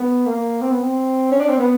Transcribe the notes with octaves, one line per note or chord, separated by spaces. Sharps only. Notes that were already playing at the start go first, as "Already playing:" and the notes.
Already playing: B3
A#3
C4
B3
C4
C#4
D4
C4
B3